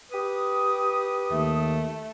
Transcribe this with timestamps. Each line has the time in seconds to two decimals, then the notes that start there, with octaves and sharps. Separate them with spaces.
0.12 G4 B4 D#6
1.31 D#2 A3